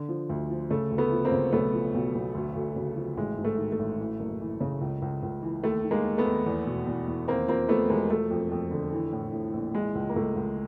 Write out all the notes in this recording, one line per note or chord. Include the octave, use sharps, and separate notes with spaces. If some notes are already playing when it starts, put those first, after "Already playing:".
Already playing: D3
F3
D2
F3
C#3 A3
D2
A3 B3
F3
A#3 C4
C#3
B1 A3 B3
F3
B1
B1
D2
D2
C#3
F3
A1 G#3
G#2
A3
D#3
A3
A1
E3
F#1
E3
C#3
C#2
C#2
C#2
E3
D#2 A3
D#3
G#3 A#3
D#2
A3 B3
D#2
E2
B2
E2
E2
D#2 A#3 C4
F3 A#3 C4
F3 A3 B3
E1 G#3 A#3
F3 A3
F2
F2
D3
E3
A2
A2
A#1
E3 G#3
C#2
A#3
C#2 A3
C#2